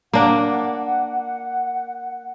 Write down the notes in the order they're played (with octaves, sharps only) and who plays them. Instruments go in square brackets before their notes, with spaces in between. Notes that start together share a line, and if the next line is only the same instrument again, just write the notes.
[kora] A#3 D4 [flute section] F#5